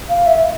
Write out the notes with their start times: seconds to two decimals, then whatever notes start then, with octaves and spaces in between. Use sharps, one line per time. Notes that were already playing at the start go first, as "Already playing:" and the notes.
0.09 F5
0.27 E5